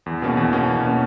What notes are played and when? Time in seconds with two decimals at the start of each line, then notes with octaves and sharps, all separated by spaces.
0.06 E2
0.22 B2 A#3 C#4
0.37 E2
0.53 B2 A#3 C#4
0.68 E2
0.83 B2 A#3 C#4